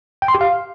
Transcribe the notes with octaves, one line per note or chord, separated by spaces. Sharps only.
G5
C6
G4
F5